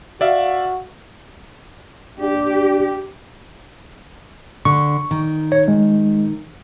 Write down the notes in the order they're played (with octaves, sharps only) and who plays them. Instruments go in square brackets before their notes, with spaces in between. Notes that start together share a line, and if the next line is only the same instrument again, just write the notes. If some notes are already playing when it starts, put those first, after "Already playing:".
[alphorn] F#4 [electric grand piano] D5 E5 F5
[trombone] D4 [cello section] G4
[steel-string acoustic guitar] D3 [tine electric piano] C#6
[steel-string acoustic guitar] D#3
[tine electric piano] C#5
G#3